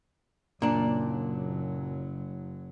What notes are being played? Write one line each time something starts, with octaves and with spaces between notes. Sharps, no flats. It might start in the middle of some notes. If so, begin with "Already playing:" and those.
F#1 A#2 F#3 D4